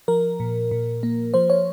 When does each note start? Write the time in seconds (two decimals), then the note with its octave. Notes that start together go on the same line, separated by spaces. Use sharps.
0.08 F3 A#4
0.40 A#2
0.71 A#2
1.03 A#3
1.34 F3 C5
1.50 C#5